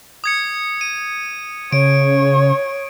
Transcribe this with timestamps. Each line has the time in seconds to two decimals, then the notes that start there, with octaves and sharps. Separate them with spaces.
0.24 D#6 G#6 C#7
0.81 D#7
1.72 C#3 C#5 D7